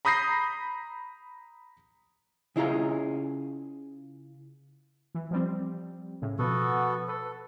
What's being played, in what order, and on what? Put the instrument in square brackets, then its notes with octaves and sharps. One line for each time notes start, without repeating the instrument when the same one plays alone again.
[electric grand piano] A#5 B5 D#6 G6 A#6 C7
[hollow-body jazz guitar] C#3 E4 F4 G#4 A#5
[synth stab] E3
F3 G3 C4
A2 C#3
[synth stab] B2 F3 [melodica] B3 F#4 A4
[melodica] A4 [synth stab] B4